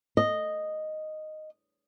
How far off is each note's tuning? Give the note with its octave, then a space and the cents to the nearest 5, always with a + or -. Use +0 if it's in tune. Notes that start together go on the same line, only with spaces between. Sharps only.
D#5 -5